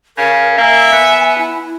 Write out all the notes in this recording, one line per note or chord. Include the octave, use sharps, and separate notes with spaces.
C#3 A#4
A#3 E5 G#5
B3
E4